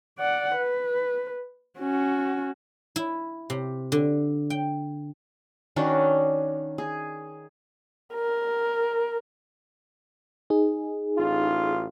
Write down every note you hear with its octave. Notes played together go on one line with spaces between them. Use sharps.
D5 F#5
B4
C#4 F#4
E4
C3
D3
G5
D#3 C#4 D4 F#4
G#4
A#4
D#4 G#4
A1 F4